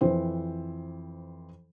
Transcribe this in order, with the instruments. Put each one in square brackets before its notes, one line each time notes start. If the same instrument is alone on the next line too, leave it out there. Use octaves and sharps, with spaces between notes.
[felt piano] F2 E3 C4 C5